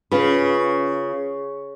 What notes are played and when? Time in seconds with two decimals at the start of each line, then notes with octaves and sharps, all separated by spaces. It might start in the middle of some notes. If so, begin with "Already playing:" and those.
0.11 C#3 F4 B4